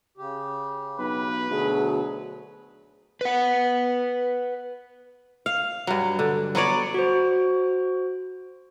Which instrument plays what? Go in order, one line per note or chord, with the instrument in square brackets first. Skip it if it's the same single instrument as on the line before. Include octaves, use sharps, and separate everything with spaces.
[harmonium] C#3 G4
[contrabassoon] B1 [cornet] B4
[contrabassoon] D2 [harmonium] B2 F#3 [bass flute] G#4
[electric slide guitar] B4 F#5
[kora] F5
G2 F#3
D3
F#3 B3 C#5 D5
[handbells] F#4 C5